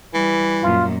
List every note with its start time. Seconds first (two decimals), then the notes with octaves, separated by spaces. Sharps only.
0.14 E3 G3
0.63 F#2 A#2 F4